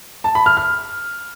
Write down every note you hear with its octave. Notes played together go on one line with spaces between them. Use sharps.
A5
B5
F6
F6